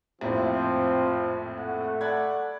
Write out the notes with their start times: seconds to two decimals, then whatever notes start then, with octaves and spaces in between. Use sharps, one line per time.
0.21 A#1 F2 A2 F3 C4
1.59 A3 F#5
2.01 D5 F#5 B5 G#6